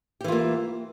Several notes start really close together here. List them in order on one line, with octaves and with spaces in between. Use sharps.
G4 E3 F4 A#3